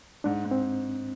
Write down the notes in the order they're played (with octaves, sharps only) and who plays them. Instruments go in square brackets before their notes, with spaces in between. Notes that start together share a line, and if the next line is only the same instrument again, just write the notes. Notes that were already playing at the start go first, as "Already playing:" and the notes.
[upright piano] G#2 [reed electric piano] D4
[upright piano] G#2
[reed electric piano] C4